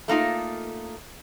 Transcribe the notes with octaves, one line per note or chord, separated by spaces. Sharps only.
A3 A#3 D#4 F4